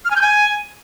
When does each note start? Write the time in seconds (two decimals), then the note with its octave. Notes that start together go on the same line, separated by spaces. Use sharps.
0.05 F6
0.10 G#5
0.16 G6
0.21 G#5